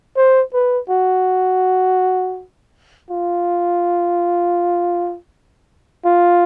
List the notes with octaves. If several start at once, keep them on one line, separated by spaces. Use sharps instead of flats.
C5
B4
F#4
F4
F4